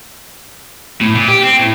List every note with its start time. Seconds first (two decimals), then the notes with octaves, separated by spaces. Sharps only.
1.01 A2
1.15 A#2
1.28 G4
1.43 C4
1.59 A2